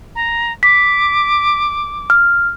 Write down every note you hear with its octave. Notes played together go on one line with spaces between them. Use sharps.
A#5
D6 B6
F6